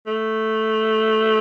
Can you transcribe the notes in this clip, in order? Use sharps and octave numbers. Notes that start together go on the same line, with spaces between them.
A3